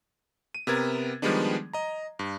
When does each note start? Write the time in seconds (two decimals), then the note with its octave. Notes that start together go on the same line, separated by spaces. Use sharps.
0.55 D#7
0.67 C3 B3 A#4 G#6 A6
1.22 D#3 F3 G3 G#3 B3 D4
1.73 D#5 A#5
2.19 G2